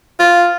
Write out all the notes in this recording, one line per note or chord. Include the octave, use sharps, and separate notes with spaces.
F4